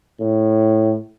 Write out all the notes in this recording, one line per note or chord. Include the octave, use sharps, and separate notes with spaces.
A2